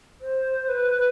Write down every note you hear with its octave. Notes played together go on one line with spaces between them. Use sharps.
C5
B4